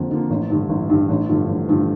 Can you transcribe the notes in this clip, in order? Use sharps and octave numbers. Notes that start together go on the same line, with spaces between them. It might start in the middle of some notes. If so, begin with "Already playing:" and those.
Already playing: F2 D3 F3 A#3
D3 F3 A#3
A1
G2 D3
A1
G2 D3
A1
G2 D3 F3 A3
A1
G2 D3 F3 A3